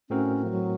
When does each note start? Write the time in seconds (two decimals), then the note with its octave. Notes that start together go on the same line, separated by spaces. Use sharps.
0.10 A2 A3 C4 C#4 F#4 A#4
0.45 F3
0.50 F#3